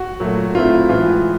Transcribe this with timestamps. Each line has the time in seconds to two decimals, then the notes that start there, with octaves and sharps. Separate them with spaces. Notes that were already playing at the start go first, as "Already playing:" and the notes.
Already playing: F#4
0.20 A#2 F#3 A3
0.55 A2 F#3 A3 C4 E4 F4
0.89 A2 E3 G#3 B3 F4